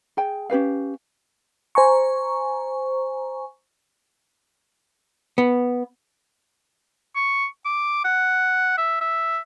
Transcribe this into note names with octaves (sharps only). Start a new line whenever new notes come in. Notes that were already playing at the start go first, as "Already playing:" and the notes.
G#4 G5 G#5
C#4 G4 B4 F5
C5 G#5 A#5 C#6
B3
C#6
D6
F#5
E5
E5